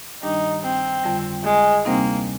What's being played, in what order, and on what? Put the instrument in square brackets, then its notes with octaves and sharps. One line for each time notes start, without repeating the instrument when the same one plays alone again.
[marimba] G2 D#3 G3 D4 G4 [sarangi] D#4
[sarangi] C4
[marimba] F2 D3 G3
[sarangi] G#3
[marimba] D2 C3 G3 C4 D#4 [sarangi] A#3